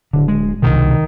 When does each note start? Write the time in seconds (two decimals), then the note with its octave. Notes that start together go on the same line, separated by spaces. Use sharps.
0.13 D1 D3
0.28 G#3
0.62 C2 G2 B2 D#3